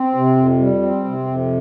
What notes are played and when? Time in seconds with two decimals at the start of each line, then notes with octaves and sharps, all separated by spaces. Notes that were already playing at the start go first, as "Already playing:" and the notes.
Already playing: C4
0.15 C3
0.37 F2
0.59 G3
0.81 C4
1.04 C3
1.26 F2